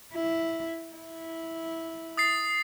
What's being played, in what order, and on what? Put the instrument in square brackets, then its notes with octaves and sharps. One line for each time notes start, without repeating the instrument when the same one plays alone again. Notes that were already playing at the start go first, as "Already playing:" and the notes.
[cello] E4
E4
[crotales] D#6 A6 C7